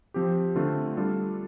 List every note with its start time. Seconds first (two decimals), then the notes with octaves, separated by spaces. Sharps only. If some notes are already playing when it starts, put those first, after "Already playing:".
0.14 F3 C4 G4
0.56 D3 A3 C4 F4
0.97 G3 D4 F4 A4